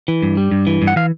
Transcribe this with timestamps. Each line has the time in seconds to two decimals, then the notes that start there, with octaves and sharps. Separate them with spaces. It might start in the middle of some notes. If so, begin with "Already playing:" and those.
0.08 E3
0.22 G2
0.37 G3
0.51 G2
0.67 E3
0.82 G2
0.87 F#5
0.96 E3 F5